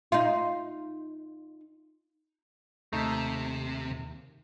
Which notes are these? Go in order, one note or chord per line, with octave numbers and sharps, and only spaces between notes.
D#4 F4
D#2 C3 A3 D#4 E5